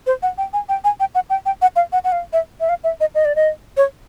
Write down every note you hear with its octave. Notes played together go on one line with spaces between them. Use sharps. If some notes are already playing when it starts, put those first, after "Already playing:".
C5
F#5
G5
G#5
G5
G#5
G5
F#5
G5
G5
F#5
F5
F#5
F#5
F5
E5
E5
F5
E5
D#5
D#5
D5
D#5
C#5